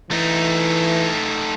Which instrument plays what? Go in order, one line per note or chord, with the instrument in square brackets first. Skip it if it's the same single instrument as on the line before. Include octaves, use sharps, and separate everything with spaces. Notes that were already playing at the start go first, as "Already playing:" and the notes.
[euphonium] E3 [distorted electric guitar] A3 D#4